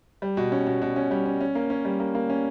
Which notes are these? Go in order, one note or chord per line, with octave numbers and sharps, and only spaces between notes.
G3
B2
C#4
B2
B2
C#4
G3
C#4
C#4
A#3
C#4
G3
A#3
A#3
C#4